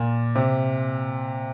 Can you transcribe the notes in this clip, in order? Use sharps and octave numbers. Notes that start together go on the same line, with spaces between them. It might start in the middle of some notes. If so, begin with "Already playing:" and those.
Already playing: A#2
C3